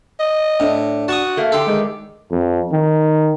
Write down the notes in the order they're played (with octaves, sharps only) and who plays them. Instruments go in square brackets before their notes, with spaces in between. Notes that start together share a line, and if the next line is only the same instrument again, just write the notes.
[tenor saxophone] D#5
[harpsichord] A2 [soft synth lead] D4
[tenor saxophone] F#4 [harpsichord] A5 C#6 D#6
[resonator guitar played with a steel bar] A3 A#3
[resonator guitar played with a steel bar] D3 G4 [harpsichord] A4 [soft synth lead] C6
[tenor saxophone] D#3 [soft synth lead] G#3
[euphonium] F2
D#3